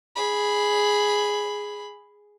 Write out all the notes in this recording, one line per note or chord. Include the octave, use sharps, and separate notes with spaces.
G#4 B5